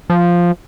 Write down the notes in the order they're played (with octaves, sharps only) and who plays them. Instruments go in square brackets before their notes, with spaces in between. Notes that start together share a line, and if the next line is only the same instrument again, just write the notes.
[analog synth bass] F3